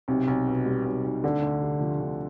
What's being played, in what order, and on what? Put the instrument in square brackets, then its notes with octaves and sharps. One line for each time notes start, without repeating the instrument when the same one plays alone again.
[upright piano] B1 [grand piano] C3
[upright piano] B1
B2
G3
B1
B1
[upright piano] D2 [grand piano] D3
[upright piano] D2
C3
F3
D2